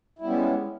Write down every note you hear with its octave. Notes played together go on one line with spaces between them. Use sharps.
G3 G#3 B3 C#4 E4